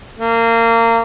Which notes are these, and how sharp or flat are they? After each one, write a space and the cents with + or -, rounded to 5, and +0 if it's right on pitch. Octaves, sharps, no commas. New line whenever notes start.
A#3 -25